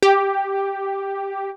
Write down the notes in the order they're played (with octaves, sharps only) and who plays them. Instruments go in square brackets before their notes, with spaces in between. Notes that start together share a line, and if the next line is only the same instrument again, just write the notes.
[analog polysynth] G4